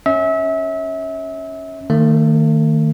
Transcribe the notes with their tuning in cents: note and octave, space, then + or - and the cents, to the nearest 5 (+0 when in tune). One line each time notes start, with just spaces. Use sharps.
C#4 +0 E5 -30
D#3 +0 A3 +45